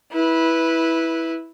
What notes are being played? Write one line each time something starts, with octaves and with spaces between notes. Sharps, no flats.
E4 B4